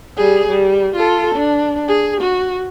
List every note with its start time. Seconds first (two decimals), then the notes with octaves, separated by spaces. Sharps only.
0.17 G3 G#4
0.49 G3
0.96 F4 A4
1.35 D4
1.88 G#4
2.21 F#4